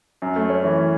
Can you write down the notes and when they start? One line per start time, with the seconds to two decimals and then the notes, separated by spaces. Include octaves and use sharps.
0.22 F#2
0.36 A3
0.50 C#4
0.64 E3